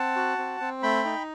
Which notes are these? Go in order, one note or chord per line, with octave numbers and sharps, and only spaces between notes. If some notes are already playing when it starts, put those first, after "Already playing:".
Already playing: C4 F#5 A5
F#4
C4
C4
A3 G5 B5
D#4